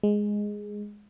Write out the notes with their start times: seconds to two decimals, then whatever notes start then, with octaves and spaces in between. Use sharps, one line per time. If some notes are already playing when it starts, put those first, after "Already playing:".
0.03 G#3